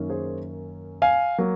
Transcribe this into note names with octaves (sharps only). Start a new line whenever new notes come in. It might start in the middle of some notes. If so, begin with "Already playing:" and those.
Already playing: F#2 D#3 A#3 C#4
G#4 C5
F5 G#5
F#3 A#3